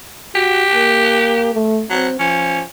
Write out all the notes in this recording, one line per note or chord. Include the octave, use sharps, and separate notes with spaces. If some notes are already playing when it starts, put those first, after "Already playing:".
F#4 G4
A#3
A3
F#3 C4
F3 C#4